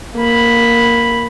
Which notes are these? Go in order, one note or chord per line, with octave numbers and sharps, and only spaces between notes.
A#3 B5